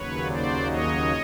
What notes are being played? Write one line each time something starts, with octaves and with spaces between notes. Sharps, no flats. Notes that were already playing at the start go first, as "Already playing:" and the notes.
Already playing: D#2 C#3 F#3 B4 C#5
C5 D5
C#5 D#5